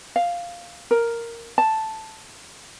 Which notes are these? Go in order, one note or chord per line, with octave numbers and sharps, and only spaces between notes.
F5
A#4
A5